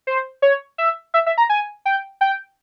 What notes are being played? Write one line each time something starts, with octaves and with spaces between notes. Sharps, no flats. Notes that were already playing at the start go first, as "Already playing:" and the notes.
C5
C#5
E5
E5
E5
A#5
G#5
G5
G5